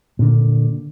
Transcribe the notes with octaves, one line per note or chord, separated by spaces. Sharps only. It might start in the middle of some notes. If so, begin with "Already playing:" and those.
A#2 D3